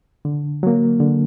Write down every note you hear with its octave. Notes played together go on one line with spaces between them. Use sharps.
D3
F#3 A#3
D3